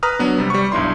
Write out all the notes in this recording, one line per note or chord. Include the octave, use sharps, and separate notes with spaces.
B4 A#5 D#6 F6
F#3 B3 D4
C3 G3
G3 C#6
B1 G2 E4 C6